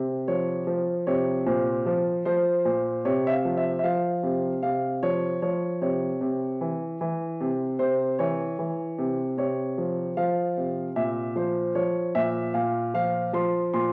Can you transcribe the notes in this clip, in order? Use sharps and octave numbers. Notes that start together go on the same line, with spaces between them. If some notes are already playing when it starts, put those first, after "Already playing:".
Already playing: C3
F3 C#5
F3
C3 C#5
A#2 C5
F3
F3 C5
A#2 C5
C3 C#5
E5
F5
F3
E5
E5
F3 F5
C3
C3 F5
F3 C#5
F3 C#5
C3 C#5
C3
E3
E3
C3
C3 C5
E3 C#5
E3
C3
C3 C#5
F3
F3 F5
C3
A#2 E5
F3 C5
F3 C#5
A#2 E5
A#2 F5
F3 F5
F3 C6
A#2 C6